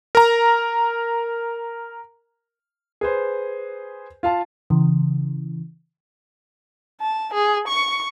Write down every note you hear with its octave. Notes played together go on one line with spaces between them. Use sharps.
A#4 A#5
G#4 B4 C5
F4 F5 A5
C#3 E3
A5
G#4
C#6